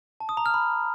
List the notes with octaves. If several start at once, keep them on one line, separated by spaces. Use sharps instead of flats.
A5
D#6
A#5
F6
B5